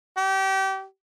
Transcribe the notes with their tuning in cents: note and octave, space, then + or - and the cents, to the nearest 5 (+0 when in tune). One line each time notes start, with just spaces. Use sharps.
G4 -30